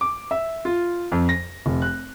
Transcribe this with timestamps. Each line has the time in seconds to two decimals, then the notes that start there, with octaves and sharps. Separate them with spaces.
0.01 D6
0.31 E5
0.65 F4
1.12 F2
1.29 A#6
1.66 F1
1.82 F#6